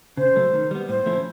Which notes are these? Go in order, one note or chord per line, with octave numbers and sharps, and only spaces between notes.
C#3 C5
F#3 A3
D#3
G3 B3
A2 C5
F3 A3 C#4 E4